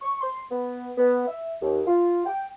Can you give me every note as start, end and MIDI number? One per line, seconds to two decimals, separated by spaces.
0.02 0.21 85
0.21 0.43 84
0.51 0.91 59
0.98 1.24 59
1.27 1.53 76
1.62 1.82 39
1.87 2.22 65
2.26 2.46 79